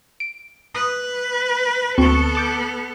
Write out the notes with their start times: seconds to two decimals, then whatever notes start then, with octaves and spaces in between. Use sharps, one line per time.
0.20 D7
0.75 B4 D#6
1.98 D2 B3 C4 A4 C#6
2.35 A5 D6 G6